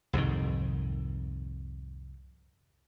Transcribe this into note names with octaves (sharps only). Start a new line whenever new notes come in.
C2 F2 G#2 D#3